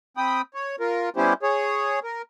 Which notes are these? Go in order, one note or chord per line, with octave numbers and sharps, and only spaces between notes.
C4 G5 B5 D#6
C#5
F4 A#4
G3 B3 C#4 E4 G4 C5
G#4 C#5
A#4